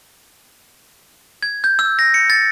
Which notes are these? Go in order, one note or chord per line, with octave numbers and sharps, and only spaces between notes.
G#6
G6
E6
A#6
C#7
A6